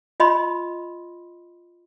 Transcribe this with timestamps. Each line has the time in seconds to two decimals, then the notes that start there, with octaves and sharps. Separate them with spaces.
0.20 F4 D#5 B5 C6